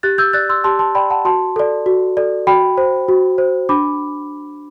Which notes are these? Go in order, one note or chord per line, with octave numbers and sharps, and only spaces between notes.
G4 F#6 A6
E6 G6
D5 F#6 A6
C6 E6
G4 A5 C6
A5 C6
D5 G5 B5
F#5 A5
F#4 A5 C6
A4 D5
F#4
A4 D5
F#4 G5 B5
C5
F#4
C5
D4 B5 D6